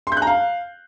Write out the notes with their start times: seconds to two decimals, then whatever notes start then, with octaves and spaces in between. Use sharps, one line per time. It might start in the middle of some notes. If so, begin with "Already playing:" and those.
0.07 C6
0.12 G6
0.17 F#6
0.22 A#5
0.27 F5